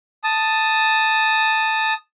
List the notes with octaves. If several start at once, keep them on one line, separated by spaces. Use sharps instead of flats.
A5 D#6